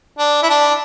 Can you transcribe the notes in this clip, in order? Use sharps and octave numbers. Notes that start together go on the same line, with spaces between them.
D4
E4
D4